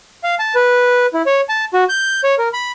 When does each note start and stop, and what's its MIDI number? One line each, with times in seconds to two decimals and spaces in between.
0.24 0.35 77
0.39 0.55 81
0.55 1.06 71
1.14 1.22 64
1.26 1.41 73
1.49 1.65 81
1.74 1.84 66
1.89 2.21 91
2.24 2.35 73
2.38 2.48 70
2.53 2.72 83